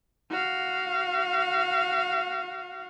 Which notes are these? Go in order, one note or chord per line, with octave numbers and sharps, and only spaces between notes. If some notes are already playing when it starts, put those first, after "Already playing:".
F#4 F5